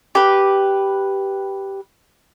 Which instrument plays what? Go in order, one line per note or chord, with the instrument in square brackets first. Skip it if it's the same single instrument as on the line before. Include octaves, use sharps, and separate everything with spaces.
[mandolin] G4 B4